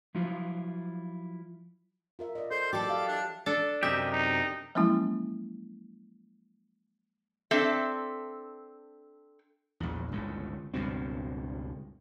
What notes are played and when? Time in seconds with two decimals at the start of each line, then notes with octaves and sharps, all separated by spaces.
0.15 F3 F#3 E4 F4
2.19 F4 A#4 E5
2.35 D5 D#5
2.51 A4 C5
2.73 E3 F#3 G4 A4 D5
2.89 E5 F5
3.08 D4
3.46 D4 A4
3.83 F#2 C3 G4 D#5 E5
4.12 D#4
4.75 F3 F#3 G#3 A#3 C#4 E4
7.51 C4 D4 A4 E5
9.80 A#1 E2
10.12 G1 C#2 A2
10.74 C#2 G2 B2 C4